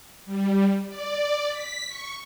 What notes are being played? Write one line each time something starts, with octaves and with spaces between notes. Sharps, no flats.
G3
D5
B6
C#6